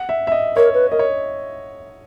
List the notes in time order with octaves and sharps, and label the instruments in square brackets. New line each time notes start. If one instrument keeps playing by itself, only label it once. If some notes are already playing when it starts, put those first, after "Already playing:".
Already playing: [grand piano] F#5
E5
E5
D#5
[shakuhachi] A#4 [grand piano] C#5
[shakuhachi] B4
[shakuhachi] A#4 [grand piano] D#5
[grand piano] C#5